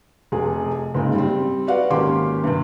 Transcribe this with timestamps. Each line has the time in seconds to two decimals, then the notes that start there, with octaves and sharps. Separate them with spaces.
0.32 F1 C3 G#4
0.95 F#1 G#2 C#3
1.15 G3 C4
1.67 F#4 B4 D5 F5 F#5
1.90 G#1 A#3 C#4 G4 C6 D6
2.44 G2 C3